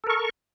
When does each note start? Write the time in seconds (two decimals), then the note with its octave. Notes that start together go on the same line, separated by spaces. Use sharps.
0.04 A4
0.07 A#4
0.10 C#6